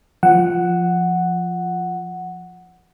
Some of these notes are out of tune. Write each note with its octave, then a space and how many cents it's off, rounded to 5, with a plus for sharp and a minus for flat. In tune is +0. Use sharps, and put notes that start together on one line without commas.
F3 +0 F#5 +0